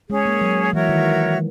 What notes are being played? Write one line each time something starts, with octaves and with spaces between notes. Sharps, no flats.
G#3 C#4 G#4 C#5
A#3
F#3
E3 F#4 A#4 C#5 E5
D#3